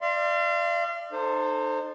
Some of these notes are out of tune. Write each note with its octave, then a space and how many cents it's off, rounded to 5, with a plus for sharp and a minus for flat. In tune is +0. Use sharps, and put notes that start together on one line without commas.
D5 +25 F5 -35 C6 +5
D#4 -40 A4 +0 C5 +0